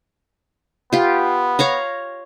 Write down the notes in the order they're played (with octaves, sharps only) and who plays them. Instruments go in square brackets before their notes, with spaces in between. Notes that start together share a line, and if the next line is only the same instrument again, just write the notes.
[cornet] B3 [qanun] F4 G4
[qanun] C#5 F5 A#5